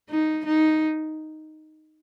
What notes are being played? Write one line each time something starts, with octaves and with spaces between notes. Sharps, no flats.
D#4
D#4